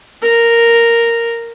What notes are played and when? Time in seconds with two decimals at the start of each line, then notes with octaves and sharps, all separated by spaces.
0.22 A#4